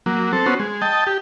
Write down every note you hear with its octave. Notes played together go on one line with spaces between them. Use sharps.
F#3 A#3
C4 A4
B3 C#4 F#4 C5
G#3
D#5 G5 A5
G4